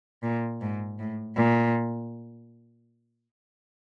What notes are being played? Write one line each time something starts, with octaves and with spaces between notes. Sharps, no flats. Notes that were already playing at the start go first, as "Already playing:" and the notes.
A#2
G#2
A2
A#2